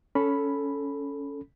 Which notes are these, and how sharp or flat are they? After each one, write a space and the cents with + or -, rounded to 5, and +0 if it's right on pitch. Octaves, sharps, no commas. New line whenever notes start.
C#4 +15 A4 +0 B5 +0